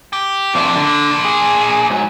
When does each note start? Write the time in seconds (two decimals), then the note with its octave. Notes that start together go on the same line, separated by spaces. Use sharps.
0.13 G4
0.55 F2 A#2 A3 D4 D5
0.76 D3
1.25 G#4
1.90 G#2 F#3 G#5